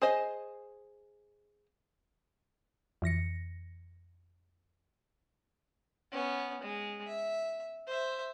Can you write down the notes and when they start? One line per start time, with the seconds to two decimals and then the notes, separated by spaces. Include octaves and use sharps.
0.02 G#4 C5 D#5 G#5
3.02 F2 E3 A#6 C#7
6.12 B3 C#4
6.61 G#3
7.07 E5
7.88 C5 E5